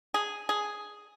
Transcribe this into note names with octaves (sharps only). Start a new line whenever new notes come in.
G#4
G#4